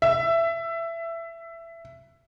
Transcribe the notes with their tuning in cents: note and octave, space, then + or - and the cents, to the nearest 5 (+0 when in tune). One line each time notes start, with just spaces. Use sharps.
E5 +15